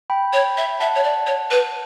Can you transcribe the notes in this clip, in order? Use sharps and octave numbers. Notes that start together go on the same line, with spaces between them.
G5 B5
C#5
E5
E5 F#5 A5
C#5
D5
C#5
B4